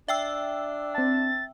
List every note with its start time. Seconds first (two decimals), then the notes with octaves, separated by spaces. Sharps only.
0.08 D4 E5 G5 E6
0.95 C4 A5 A6